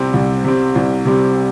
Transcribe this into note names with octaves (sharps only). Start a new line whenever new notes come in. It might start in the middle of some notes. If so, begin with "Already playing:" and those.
Already playing: C2 C3 G3 C4
C2
C3 G3 C4
C2
C3 G3 C4